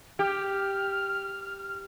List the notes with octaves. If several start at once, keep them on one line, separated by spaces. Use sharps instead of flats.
G4 F6